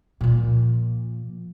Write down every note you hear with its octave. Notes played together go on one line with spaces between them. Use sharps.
A#2 F3